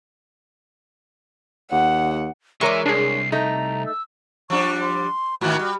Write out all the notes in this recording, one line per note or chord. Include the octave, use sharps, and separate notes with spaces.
D#2 F#5
E3 G#3 A#4 C#5 E5 C#6 D6
C2 D4 G#4 C7
A3 D#4 A#5
E6
F3 G3 D4 C#6
C6
G#2 D#3 F#4
G3